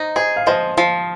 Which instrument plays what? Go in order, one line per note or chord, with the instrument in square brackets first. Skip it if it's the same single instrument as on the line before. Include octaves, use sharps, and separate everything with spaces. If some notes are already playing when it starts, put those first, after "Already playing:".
Already playing: [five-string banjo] D#4 [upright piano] C5 D#5
[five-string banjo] G#4 [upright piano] C5 D#5
[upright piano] F5
[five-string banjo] F3 [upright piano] C5 D#5
[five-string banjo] F3